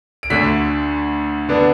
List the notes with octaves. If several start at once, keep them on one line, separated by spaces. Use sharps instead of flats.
D7
D2 D3 A3 D4 B6
D3 B3 D4